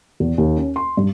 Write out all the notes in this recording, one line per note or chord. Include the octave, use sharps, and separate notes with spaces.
E2
D#2
C#4
C6
G2